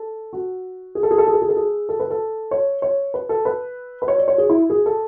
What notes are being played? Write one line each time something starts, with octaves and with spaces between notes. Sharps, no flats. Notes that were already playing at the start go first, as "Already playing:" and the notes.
Already playing: A4
F#4
G#4
A4
G#4
A4
G#4
A4
G#4
A4
G#4
A4
B4
A4
C#5
C#5
B4
A4
B4
B4
C#5
D5
C#5
G#4
E4
G#4
A4